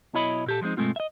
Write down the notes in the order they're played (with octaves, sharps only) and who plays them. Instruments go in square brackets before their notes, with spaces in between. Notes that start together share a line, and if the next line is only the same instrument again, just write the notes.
[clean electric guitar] B1 B2 E4 C#5 D#5 B5
A#2 G4 A4
F3 G3 G#3 C4 D#4
G2 B2 G#3 A3 C4 F4
D#5 E5